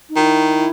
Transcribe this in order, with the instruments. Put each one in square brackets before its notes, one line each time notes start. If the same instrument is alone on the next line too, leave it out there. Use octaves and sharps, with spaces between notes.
[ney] D#4
[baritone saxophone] D#3 [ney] F#4
[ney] E4